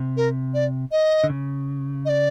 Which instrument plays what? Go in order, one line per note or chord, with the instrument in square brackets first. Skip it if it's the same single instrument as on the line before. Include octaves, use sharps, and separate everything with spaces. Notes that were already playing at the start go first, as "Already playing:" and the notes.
Already playing: [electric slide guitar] C3
[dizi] A#4
D5
D#5
[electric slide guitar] D3
C#3
[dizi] D#5
D5